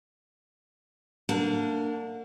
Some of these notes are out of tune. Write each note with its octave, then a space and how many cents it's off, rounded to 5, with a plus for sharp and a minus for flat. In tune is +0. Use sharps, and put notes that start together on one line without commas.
A#3 -30 D4 +0 F#5 -35